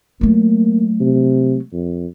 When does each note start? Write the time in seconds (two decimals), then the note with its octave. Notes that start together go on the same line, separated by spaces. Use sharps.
0.21 F#3 A3 A#3
1.01 C3
1.73 F2